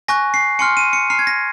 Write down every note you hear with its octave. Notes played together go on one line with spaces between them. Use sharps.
G#5 C#6 F#6 A#6
C7
G#5 C6 F6 C#7
D#7
C#7
A#5 F6 C7
G#6
A#6